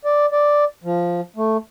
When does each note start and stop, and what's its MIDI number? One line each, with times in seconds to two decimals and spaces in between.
0.05 0.26 74
0.32 0.64 74
0.84 1.21 53
1.36 1.57 57